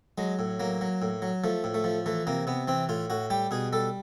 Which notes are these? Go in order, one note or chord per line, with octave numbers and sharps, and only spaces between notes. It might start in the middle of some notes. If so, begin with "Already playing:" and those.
F#3 G#3
A2
F#3 A#3
F#3
A2
F#3
F3 A3
A2
A3
F3
E3 A3
C3 A#3
C3 B3
E3 C4
A2 F4
A2 F#4
G3 G4
B2 G#4
G3 A4